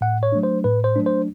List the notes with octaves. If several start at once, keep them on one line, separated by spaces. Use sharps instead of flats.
A2 F#5
C#5
F#3 A3 D4
C5
A2 B4
C5
F#3 A3 D4
C5